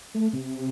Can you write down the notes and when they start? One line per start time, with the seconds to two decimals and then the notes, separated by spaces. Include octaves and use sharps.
0.14 A3
0.33 C3